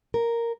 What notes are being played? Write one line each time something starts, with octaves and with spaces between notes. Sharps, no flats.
A#4